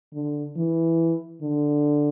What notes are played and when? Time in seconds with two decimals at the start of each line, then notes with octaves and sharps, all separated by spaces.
0.14 D3
0.56 E3
1.42 D3